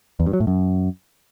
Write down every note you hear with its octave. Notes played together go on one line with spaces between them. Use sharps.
E2
G2
F#3
A2
F#2